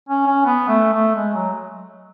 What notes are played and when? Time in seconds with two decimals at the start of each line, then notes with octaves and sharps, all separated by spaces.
0.09 C#4
0.26 C#4
0.45 B3
0.68 A3
0.93 A3
1.15 G#3
1.34 F#3